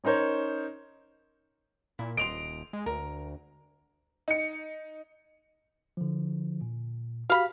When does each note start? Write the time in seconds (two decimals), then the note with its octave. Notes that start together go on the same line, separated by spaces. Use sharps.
0.04 C#4 D#4 A#4 C5 C#5
1.99 A#2 E4
2.17 D#1 D#5 C6 D7 F7
2.73 G#3
2.86 D2 A#4
4.28 D#4 C#7
5.97 D3 F3
6.61 A#2
7.30 F#4 G4 F5 B5